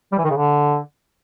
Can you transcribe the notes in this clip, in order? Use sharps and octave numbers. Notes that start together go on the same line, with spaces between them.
G3
E3
D#3
C#3
D3